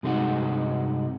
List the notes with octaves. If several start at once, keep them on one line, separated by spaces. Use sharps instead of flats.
G2 C3 G#3 D#4 F#4